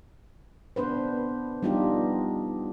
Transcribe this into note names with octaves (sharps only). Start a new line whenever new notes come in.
B3 D4 B4 C5
G3 B3 D4 D#4 F4 G4